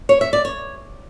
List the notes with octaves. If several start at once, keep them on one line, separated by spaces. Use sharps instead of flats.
C#5
E5
D5
C#5